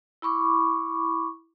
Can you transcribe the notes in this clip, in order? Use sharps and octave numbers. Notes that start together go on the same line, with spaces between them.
E4 B5 C#6 D6